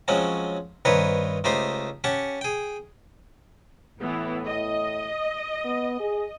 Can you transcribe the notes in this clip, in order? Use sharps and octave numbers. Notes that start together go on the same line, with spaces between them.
F3 F#3 G#3 C4 C#4
G2 D#3 C4 D#4 B4 C#5
C#2 A3 D#4 G4 C5 C6
C#4 G4 F#5 A5 C#6
G#4 G5
A2 E3 B3 E4
D#5
B3
G#4